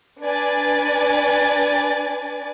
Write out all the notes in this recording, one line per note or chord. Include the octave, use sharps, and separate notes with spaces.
D4 B4 D5 G#5 A6